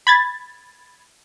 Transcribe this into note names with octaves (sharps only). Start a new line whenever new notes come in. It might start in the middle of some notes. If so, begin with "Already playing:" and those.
B5 G#6 A6